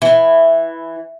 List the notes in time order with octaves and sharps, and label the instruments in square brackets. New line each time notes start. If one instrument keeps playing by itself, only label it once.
[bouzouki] E3